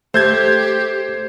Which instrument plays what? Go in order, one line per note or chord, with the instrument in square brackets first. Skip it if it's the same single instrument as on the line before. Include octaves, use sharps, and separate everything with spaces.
[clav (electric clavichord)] A3 [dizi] G4 [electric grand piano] C5 G6 G#6